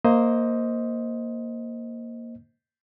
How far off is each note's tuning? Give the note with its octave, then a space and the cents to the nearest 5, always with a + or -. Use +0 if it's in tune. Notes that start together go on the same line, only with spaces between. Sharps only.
A#3 +0 C5 +0 D#5 +15